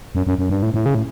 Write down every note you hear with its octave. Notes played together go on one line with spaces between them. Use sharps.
F#2
F#2
F#2
G2
A2
A2
C#3
A2